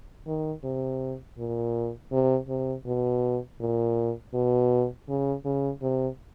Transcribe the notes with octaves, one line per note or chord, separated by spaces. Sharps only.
D#3
C3
A#2
C3
C3
B2
A#2
B2
C#3
C#3
C3